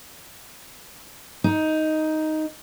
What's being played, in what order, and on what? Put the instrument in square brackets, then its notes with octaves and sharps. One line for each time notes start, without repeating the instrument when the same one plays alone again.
[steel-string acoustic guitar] D#4